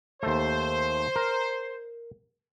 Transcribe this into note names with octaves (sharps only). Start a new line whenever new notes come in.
D#2 A3 C5
A#4